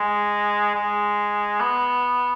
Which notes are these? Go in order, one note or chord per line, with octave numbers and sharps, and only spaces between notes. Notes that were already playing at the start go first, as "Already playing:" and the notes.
Already playing: G#3
G#3
B3